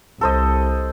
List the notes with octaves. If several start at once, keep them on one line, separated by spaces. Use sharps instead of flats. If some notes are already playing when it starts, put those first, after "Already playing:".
C2 A4 C5 D#5